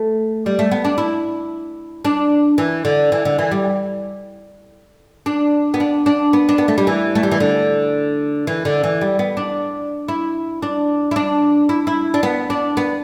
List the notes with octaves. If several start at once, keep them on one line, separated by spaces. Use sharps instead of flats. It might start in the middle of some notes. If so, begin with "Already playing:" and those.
Already playing: A3
G3
A3
B3
D4
E4
D4
E3
D3
E3
D3
E3
G3
D4
B3
D4
D4
B3
D4
B3
A3
G3
E3
A3
G3
E3
D3
E3
D3
E3
G3
B3
D4
E4
D4
E4
D4
E4
E4
D4
B3
D4
B3